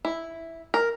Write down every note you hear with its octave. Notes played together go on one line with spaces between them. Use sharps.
E4
A#4